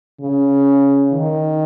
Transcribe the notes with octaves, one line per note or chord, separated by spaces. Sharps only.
C#3
D#3